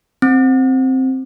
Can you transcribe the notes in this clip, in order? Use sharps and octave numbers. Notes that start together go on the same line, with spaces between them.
C4